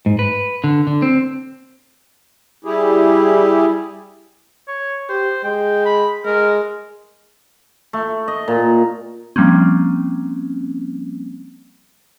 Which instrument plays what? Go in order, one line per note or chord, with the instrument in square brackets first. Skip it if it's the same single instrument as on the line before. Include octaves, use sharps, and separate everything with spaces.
[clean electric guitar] G#2
B4
D3
D3
C4
[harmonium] G3 E4 G4 G#4
[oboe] C#5
[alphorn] G4 [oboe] C5
[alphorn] G#3 [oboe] G5
[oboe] B5
[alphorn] G#3 [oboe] A#4
[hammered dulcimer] A3
D#5
A#2
[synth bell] F3 G3 A#3 C4 C#4